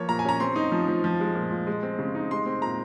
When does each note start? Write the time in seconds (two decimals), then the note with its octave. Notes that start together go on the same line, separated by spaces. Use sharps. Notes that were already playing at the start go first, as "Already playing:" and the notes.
Already playing: F3 A#3 C#5
0.08 A#2 A#5
0.19 G#5
0.25 C#4 A#5
0.40 C4 C6
0.56 D#4
0.72 F3
0.88 F3
1.04 F3
1.20 G#3
1.35 A#2
1.51 A#2
1.67 G#3
1.83 C4
1.99 C#3
2.15 D#4
2.31 G#3 C6
2.46 C4
2.62 A#2 A#5